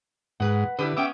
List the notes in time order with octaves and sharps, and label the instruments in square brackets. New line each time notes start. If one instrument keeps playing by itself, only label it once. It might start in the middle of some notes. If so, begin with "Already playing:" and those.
[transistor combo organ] G#2 [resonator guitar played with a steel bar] B4 F#5
[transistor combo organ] D3 [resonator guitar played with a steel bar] E4 G4 B4
[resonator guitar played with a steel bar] B3 C#4 G5 [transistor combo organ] E5 D6